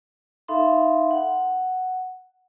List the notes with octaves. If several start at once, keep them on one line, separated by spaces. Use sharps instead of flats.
D#4 A4 E5 F5 B5 C6
F#5